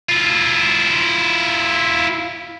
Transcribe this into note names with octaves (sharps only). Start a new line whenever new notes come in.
E4 F4